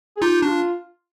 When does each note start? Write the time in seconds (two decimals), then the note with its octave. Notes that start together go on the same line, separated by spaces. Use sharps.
0.17 G#4
0.22 D#4 F4 G4
0.42 D4
0.48 F4